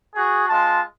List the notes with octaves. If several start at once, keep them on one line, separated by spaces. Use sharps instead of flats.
F#4 G#4
G#3 F4 A5